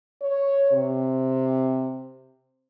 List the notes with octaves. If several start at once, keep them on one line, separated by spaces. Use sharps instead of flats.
C#5
C3